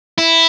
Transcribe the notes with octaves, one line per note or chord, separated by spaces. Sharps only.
E4